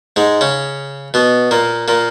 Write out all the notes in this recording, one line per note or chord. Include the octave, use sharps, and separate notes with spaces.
G#2 G#3
C#3 C#4
B2 B3
A#2 A#3
A#2 A#3